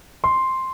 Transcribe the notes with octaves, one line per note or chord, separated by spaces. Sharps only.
C6